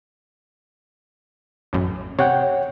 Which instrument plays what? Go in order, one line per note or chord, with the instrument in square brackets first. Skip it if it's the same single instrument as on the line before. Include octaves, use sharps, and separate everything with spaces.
[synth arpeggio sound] A1 F#2
[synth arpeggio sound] C3 [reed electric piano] C#5 F#5 G5